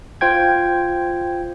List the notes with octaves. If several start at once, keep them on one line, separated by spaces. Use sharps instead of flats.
F4 C5 G5 G#6